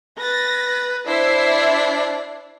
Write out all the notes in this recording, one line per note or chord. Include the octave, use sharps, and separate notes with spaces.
B4 A6 A#6
D4 E4 C5 E5 C7